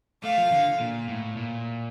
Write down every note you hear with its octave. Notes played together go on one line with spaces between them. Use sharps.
A3 F5
F3
D3
A#2
A2
A#2